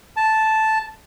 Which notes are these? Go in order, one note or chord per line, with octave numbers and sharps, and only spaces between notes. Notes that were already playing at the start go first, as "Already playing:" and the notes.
A5